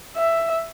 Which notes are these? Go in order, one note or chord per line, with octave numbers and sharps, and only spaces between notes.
E5